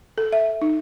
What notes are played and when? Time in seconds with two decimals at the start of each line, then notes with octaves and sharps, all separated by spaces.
0.18 A4
0.32 E5
0.62 D#4